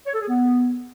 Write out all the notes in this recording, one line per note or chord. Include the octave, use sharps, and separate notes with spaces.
C#5
A4
G#4
B3